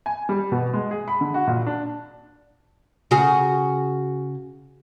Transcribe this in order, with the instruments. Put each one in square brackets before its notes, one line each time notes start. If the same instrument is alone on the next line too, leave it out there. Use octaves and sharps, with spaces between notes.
[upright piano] G#5
G3
B2
G#3
G#4
B5
D3
F#4
A#2
D4
[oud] C#3 F#4 G#4